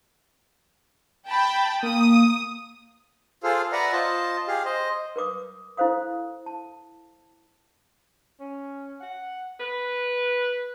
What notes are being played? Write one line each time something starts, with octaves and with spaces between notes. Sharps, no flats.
G5 A5 B5
A#3 D#6
F4 G#4 A4 C5 F5
B4 D5 E5 F#5 A#5
F4 C5 D#5 A5
G4 G#4 F5
C5 D#5
A#4 B4 D6 D#6
E4 A4 C5 F5 D#6
A5
C#4
F#5
B4